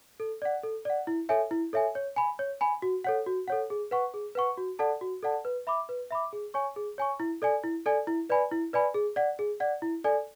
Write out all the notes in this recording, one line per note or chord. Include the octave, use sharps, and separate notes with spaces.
A4
D5 F#5
A4
D5 F#5
E4
A4 C#5 E5 G#5
E4
A4 C#5 E5 G#5
C#5
G#5 B5
C#5
G#5 B5
F#4
A4 C#5 F#5
F#4
A4 C#5 F#5
G#4
B4 F#5 C#6
G#4
B4 F#5 C#6
F#4
A4 D5 F#5 A5
F#4
A4 D5 F#5 A5
B4
E5 B5 D6
B4
E5 B5 D6
G#4
C#5 G#5 C#6
G#4
C#5 G#5 C#6
E4
A4 D5 G#5
E4
A4 D5 G#5
E4
B4 D5 G#5 B5
E4
B4 D5 G#5 B5
G#4
D5 F#5
G#4
D5 F#5
E4
A4 D5 G#5